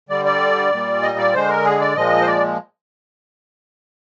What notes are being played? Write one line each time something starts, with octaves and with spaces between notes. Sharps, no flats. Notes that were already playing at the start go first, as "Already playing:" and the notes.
D3 G3 D5
D5
A#2 G3
D#5
D5
D3 G#3 C5
A#4
G#4
D5
A#2 F3 G#3 D#5
C5
D5